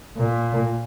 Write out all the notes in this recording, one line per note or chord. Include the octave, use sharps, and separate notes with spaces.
A#2